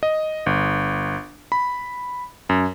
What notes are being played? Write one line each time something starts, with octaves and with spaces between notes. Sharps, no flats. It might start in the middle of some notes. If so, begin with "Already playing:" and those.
D#5
G1
B5
F#2